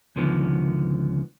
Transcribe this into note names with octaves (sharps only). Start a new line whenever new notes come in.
C#2 D3 D#3 F3 B3